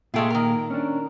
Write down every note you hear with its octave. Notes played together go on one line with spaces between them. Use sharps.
A#2 G#3 A3 F4 G5
D#3 A#4
C#4 D4